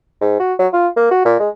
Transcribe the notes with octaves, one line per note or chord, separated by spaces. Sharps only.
G#2
F#4
F#3
F4
A#3
F#4
A#2
G#3